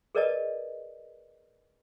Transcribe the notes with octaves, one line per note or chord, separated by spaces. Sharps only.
G#4 A#4 B4 D5 D#5 A5